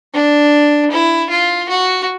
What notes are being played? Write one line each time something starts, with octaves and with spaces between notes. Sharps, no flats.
D4
E4
F4
F#4